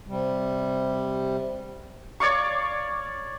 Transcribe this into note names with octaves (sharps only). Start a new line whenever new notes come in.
C3 G3
C#5 D5 F5 C#6